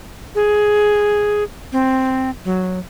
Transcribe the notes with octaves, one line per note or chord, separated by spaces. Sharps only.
G#4
C4
F#3